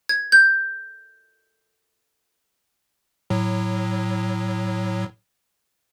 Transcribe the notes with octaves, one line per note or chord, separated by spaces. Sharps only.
G#6
G6
A2 F#3